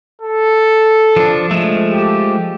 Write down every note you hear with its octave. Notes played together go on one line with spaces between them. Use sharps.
A4
F3 D4
F3 G#3 A3
G4